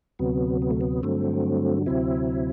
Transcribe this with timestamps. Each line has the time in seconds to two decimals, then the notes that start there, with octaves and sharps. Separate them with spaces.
0.19 D2 C3 F#3 B3
0.62 B3
0.71 A3
0.81 B3
1.03 G2 D3 F#3 A3 C4
1.86 D2 C3 F#3 C4 E4